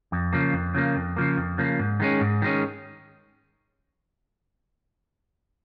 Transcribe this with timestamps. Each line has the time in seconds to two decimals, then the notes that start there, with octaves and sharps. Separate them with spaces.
0.12 F2
0.33 C#3 F3 A#3
0.53 F2
0.74 C#3 F3 A#3
0.96 F2
1.16 C#3 F3 A#3
1.37 F2
1.58 C#3 F3 A#3
1.79 G#2
2.00 D#3 G#3 C#4
2.21 G#2
2.42 D#3 G#3 C#4